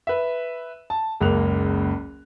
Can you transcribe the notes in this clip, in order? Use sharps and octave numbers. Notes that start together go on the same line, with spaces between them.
B4 E5
A5
F#1 C#2 A#3 F#6 F7